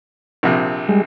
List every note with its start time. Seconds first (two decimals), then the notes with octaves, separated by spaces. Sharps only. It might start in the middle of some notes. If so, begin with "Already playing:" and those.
0.43 A#1 C3
0.89 G3 G#3